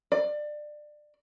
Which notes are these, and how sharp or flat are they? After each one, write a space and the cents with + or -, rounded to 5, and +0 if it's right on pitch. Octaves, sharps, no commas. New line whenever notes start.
D5 +25